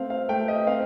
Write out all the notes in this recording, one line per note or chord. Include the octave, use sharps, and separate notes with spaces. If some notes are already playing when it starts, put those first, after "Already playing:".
Already playing: A3 C4 F5
F5
A3 G5
D#5
C4 F5